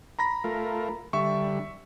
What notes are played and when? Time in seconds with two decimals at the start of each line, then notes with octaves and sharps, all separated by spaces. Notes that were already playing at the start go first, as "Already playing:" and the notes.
0.19 A#5 B5 A#6
0.44 A3 F4 A#4
1.13 D3 G3 E5 C#6